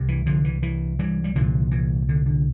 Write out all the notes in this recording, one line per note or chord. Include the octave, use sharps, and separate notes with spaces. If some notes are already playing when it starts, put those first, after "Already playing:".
Already playing: C2 C3
E3
D3 F3
E3
E3
E3 G3
G3
C2 A#2 D3 F3
E3
D3
D3